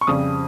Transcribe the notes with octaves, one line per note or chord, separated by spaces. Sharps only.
C#6
F2 C#3 G3 D#6